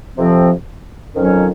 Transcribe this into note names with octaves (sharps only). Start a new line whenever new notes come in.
F2 C3 F3 C4
F2 D#3 F#3 C#4